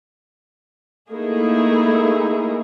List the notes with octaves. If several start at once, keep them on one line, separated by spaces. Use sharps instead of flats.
A3 A#3 D#4 E4 G#4